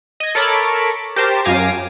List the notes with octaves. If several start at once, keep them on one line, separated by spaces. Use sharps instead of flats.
D#5 G#6
A4 A#4 C#5 B5 D6
G4 A#4 C5 A5
F#2 F5 G#5 D6 A#6 C7